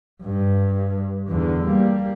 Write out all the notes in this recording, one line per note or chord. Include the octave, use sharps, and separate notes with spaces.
G2
E2 D3
G3 A#3